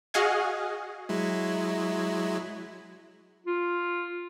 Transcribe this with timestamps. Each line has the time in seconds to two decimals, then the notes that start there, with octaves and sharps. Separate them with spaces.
0.14 F#4 G#4 D#5 F5 F#5 G#5
1.09 F#3 G#3 E4
3.46 F4